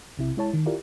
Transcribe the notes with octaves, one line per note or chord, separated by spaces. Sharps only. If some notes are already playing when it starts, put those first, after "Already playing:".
B1 C3 E4
G#3 E4 C#5 A5
D#3
E4 F4 G4 A#4 D5